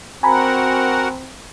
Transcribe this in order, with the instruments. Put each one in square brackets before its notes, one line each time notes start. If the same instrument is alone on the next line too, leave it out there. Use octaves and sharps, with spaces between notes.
[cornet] C4 [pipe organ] F#4 A#4 F#5 [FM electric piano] G#5 A#5 B5